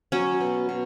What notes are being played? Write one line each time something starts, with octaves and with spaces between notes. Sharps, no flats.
F#3 C#4
B2
B2